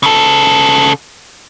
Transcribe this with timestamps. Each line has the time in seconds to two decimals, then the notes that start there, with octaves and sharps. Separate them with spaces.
0.03 C#3 A4